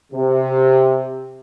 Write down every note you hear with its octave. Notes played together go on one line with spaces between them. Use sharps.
C3